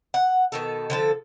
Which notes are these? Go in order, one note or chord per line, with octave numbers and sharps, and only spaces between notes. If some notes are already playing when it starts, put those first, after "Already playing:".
F#5
B2 D#3 A4
D3 F3 A4